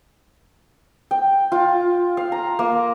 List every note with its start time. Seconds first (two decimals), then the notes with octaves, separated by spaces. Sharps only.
1.11 G5
1.52 F4
2.17 F5
2.32 A#5
2.59 A#3